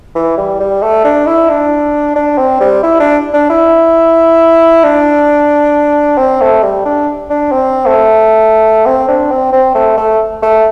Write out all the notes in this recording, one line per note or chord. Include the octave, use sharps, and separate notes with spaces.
E3
G3
G3
A3
D4
E4
D4
D4
C4
G3
E4
D4
D4
E4
D4
C4
A3
G3
D4
D4
C4
A3
C4
D4
C4
C4
A3
A3
A3